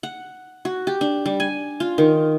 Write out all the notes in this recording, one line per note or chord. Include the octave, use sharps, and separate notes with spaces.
F#5
F#4
G4
D4
G3
G#5
F4
D#3